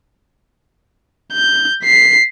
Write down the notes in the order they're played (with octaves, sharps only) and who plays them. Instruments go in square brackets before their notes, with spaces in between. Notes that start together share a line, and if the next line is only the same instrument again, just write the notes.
[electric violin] G6
B6 C7